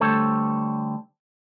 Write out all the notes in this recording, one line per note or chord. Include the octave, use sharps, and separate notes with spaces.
D3 G3 A3 A4 C5 C#5